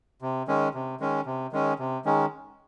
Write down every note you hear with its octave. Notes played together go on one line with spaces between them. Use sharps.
C3
D#3 G#3 C#4
C3
D#3 G#3 C#4
C3
D#3 G#3 C#4
C3
D#3 G#3 C#4